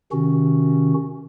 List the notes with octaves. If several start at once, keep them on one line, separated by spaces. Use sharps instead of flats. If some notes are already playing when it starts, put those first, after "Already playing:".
C3 D#3 C#4 F#4